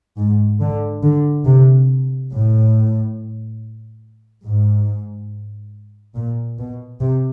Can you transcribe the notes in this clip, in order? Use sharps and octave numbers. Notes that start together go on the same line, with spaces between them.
G#2
D3
D3
C3
A2
G#2
A#2
B2
C3